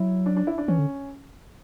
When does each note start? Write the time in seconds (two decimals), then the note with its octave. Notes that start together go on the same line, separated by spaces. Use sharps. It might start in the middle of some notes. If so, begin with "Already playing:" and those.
Already playing: F#3 E4
0.26 D4
0.37 D4
0.47 E4
0.58 D4
0.68 E3 C#4
0.79 D3